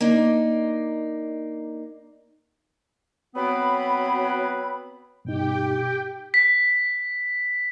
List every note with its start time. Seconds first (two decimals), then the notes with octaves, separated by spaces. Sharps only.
0.01 A#3 D4 D#4
3.35 F#3 B3 C4 B4 B5
5.25 G2 B2 D#4 G4 G5
6.34 B6